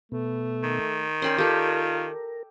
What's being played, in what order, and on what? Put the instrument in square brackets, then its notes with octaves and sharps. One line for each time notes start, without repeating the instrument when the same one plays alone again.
[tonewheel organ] B2 B3 [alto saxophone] A3
[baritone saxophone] D#3
[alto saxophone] C#4 [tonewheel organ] A#4 [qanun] D5 G5 C6
[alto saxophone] F4 [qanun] G4 A4